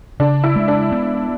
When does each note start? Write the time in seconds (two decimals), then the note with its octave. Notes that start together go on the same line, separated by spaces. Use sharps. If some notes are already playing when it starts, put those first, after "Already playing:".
0.20 C#3 D4
0.44 E4
0.56 G#3
0.68 D4
0.92 B3